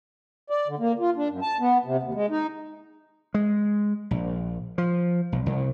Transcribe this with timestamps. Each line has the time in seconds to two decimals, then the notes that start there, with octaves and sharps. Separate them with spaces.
0.50 D5
0.68 D3
0.79 A#3
0.99 F4
1.17 D4
1.29 F#2
1.42 A5
1.60 B3
1.85 C3
2.02 D#2
2.14 G#3
2.30 D#4
3.34 G#3
4.11 A#1
4.78 F3
5.32 B1
5.46 C2